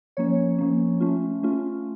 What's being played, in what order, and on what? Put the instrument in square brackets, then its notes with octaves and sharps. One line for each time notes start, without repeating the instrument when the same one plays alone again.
[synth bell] F3 A#3 C#4 C#5
F3 A#3 C#4
A3 C#4 F4
A3 C#4 F4